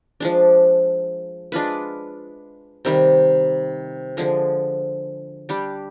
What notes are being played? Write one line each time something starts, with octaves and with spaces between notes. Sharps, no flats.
F3 G#3 D4
G#3 D4 F4 B4
C3 D#3 G3
D3 F3 G#3
G3 D4 G4